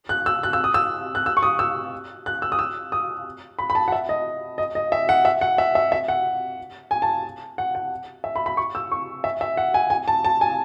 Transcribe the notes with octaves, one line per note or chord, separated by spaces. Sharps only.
F#6
E6
F#6
E6
D#6
E6
F#6
E6
C#6
D#6
E6
F#6
E6
D#6
E6
D#6
B5
B5
A5
F#5
E5
D#5
D#5
D#5
E5
F#5
E5
F#5
E5
E5
E5
F#5
G#5
A5
F#5
F#5
E5
B5
B5
C#6
E6
C#6
E5
E5
F#5
G#5
G#5
A5
A5
G#5